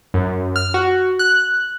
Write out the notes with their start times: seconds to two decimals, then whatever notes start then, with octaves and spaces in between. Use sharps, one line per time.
0.14 F#2
0.56 F6
0.74 F#4
1.19 F#6